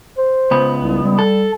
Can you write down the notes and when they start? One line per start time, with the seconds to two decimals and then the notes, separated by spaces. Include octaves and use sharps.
0.18 C5
0.51 C#2 B3
0.78 C2
1.03 G3
1.19 A4